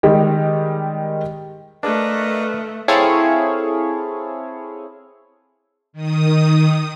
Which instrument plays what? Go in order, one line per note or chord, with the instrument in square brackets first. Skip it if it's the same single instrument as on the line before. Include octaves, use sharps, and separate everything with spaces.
[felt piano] D#3 G3 G#3 G4
[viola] A3 [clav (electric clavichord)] D4 [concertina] A#4 D#5 F5 [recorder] B4
[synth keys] C4 E4 G#4 A4 C#5 F5
[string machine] D#3 D#6